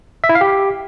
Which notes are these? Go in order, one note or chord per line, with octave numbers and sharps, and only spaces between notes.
E5
E4
F5
G4